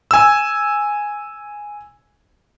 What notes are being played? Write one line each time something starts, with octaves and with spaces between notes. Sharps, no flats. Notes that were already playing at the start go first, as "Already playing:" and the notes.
G#5 E6